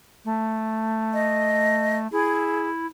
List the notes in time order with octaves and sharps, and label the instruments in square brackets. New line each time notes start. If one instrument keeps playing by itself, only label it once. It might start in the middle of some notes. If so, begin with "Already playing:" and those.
[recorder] A3
[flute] D#5
[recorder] E4 [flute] G#4